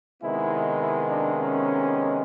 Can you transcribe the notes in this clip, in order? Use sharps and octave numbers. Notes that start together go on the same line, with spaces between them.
C3 D#3 G#3 B3 E4
E4
D4
C#4